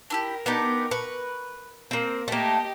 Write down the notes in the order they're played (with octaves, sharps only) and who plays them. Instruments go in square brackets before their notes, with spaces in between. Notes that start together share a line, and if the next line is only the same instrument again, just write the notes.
[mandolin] D4 E4 G4 [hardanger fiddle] A#4
[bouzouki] B3 [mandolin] D4 D#4 G4
[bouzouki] B4 [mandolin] C#6
[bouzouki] A#3 C4 [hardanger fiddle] A#4
[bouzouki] A3 A#3 [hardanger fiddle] G4 D#5